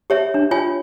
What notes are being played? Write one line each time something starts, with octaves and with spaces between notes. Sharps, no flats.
G4 C#5 E5
D4
F4 C#5 G#5